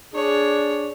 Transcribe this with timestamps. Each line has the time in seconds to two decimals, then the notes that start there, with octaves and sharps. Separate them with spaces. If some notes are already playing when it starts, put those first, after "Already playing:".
0.14 D4 G#4 C#5